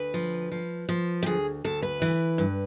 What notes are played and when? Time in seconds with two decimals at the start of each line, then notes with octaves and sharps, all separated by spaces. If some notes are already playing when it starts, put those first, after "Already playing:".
Already playing: D2 B4
0.14 F3
0.52 F3
0.89 F3
1.23 G4
1.26 D2 G#4
1.64 D2 A4
1.82 B4
2.02 E3
2.38 G2